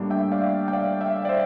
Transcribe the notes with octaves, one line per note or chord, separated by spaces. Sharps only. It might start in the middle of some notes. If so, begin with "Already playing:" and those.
Already playing: A2 G3 A#3 D4
E5 G5
D5 F5
G5
D5 F5
E5 G5
D5
C5 E5